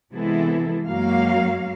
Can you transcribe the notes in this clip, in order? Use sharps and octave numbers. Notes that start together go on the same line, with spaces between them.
C3 E3 G#3 B3 E4 A4
F#2 F#3 G#3 A#3 F#4 F5